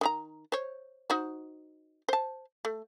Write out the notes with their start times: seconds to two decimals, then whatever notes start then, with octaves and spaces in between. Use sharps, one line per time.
0.01 D#3 E4 A#5
0.52 C5 C#5
1.10 D#4 F#4 C5
2.09 C5 A5
2.65 A3